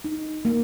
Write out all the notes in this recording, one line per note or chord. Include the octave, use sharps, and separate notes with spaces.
D#4
A#3